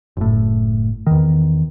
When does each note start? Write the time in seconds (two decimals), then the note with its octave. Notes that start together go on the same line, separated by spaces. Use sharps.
0.17 F#1 A2
1.07 E2 D#3